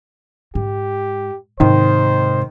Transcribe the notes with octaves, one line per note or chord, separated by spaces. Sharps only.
G#2 G4
G#2 C3 D#3 C5